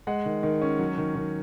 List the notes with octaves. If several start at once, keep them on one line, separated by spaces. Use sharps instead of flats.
G#3 F#5
D#3
D#3
C#4
F#3
D#3
D#3